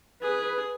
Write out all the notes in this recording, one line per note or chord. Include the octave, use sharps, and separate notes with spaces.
G#4 B4